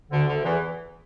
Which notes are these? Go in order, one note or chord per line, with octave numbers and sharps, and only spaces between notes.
D2 D3
D2 D3
E2 E3